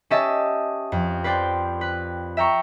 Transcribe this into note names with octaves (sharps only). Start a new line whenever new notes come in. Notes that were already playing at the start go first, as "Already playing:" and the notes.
C#4 G4 D#5 E5 A5
F2
B4 C5 D5 G5
B4
E5 G5 A#5 C#6